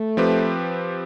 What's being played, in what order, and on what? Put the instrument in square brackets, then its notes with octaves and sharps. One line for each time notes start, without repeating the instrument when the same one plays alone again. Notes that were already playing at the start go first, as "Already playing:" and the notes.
Already playing: [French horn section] A3
[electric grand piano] F3 C4 G4 B4